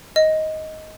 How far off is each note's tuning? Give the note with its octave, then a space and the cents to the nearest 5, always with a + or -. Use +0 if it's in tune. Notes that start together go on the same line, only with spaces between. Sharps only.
D#5 +10